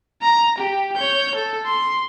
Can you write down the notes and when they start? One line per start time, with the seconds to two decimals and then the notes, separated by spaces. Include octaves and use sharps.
0.22 A#5
0.58 G4
0.96 C#5 G6
1.35 A4
1.65 C6